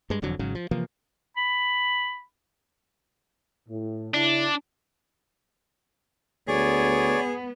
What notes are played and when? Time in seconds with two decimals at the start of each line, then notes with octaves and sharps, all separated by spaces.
0.10 G2 G#3
0.22 E1 F2 D3 F#3
0.39 G#1 G#2 C#3 F#3
0.55 F3
0.71 C3 E3 F3 A#3
1.37 B5
3.69 A2
4.14 C#3 D4 E4
6.48 D2 B3 G#4 C#5 D5